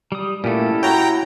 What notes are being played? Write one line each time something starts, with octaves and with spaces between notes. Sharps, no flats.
G3 D#6
A#2 A3 C#4 E4 G4 A4
F#4 C#5 G5 A#5